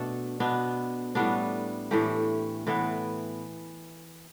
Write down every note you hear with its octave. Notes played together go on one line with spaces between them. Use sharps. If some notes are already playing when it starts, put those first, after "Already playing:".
Already playing: B2 A3 D4 A4
B2 B3 D4
A2 G3 B3 D4
A2 E3 A3 G4
A2 E3 B3